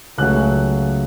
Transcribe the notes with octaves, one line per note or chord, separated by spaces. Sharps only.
C#2 C#3 F#3 A3 F#6